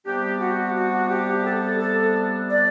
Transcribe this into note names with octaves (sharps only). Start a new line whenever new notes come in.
C3 G3 B3 D4 G4
F#4
F#4
G4
A4
A4
D5